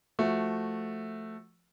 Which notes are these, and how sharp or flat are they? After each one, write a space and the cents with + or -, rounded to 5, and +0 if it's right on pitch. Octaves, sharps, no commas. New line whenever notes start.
F3 -5 A3 +0 F#4 +0